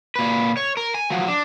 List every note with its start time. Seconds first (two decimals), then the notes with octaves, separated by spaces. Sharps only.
0.15 A#2 B4
0.57 C#5
0.77 A#4
0.94 G#5
1.10 F3 F#3
1.28 D4